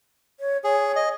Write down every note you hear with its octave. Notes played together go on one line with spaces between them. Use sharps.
C#5
G#4 C#5
D#5